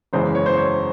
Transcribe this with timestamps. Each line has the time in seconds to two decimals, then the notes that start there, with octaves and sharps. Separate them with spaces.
0.13 F#1 E2 C#3 E3 G#3 C5
0.35 C#5
0.46 C5
0.57 C#5